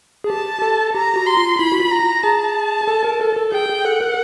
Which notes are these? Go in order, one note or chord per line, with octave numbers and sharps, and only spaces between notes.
G#4
G4 A5
A4
G4 A#5
F#4
C6
F4
E4 B5
F#4
F4
A#5
G#4 A5
A4
A#4
A4
A4
G#4 G5
G#4
A4 F#5
A#4